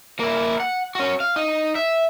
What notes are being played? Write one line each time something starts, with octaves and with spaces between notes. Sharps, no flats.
A#3 E4
F#5
C#4 F#4
F5
D#4
E5